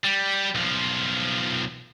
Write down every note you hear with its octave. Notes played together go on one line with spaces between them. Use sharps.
G3
B1 F3